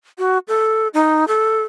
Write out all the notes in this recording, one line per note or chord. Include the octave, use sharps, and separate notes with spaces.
F#4
A4
D#4
A4